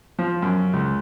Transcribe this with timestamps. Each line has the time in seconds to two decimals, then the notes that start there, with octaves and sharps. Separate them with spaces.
0.19 F3
0.42 F#2
0.73 C#2